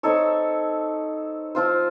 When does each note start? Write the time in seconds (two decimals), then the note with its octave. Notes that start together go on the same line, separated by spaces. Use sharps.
0.03 C4 D#4 A4 C#5
1.55 F3 C4 F4 C5